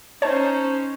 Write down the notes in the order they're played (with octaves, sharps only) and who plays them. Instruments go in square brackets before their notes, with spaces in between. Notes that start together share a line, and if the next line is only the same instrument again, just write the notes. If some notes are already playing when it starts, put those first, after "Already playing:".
[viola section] C#4 D#4 C5 [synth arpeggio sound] C#5 A5